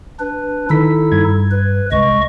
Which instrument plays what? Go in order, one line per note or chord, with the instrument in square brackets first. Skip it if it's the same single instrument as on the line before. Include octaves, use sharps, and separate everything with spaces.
[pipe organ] D4 B4
[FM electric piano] D#3 B6 [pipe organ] D#4 E4 A4
[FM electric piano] G2 G#6
[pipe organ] B4
[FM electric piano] C2 [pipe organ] G#3 D#5 C#6